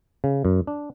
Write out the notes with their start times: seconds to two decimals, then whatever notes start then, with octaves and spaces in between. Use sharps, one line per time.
0.24 C#3
0.45 F#2
0.67 D4